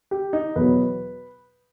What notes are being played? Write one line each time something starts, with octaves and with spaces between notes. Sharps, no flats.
G4
D#4
E2 B2 F#3 B4